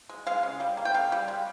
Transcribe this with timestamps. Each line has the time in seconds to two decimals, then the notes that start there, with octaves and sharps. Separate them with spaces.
0.09 G#3
0.27 G#3 F5
0.43 C#3
0.60 G3
0.77 A#3
0.85 G5
0.94 C#3 F5
1.12 G3
1.28 G#3